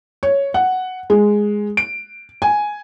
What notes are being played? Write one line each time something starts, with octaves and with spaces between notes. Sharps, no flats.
C#5
F#5
G#3
D7
G#5